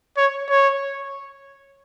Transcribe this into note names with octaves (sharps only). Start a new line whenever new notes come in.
C#5
C#5